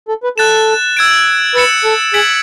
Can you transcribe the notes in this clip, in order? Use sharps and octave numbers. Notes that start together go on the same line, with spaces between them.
A4
B4
A4 F#6 A6 E7
E6 G#6 D7
B4 E6 A6 C#7 E7
A4
G#4 G#6 B6 D7 F#7